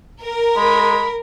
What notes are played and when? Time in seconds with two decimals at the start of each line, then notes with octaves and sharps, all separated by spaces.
0.23 A#4
0.56 G#3 B5